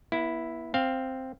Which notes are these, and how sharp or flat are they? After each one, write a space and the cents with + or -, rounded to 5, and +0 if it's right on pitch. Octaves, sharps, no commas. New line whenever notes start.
B3 -40 E4 +0
C4 +0 F5 +0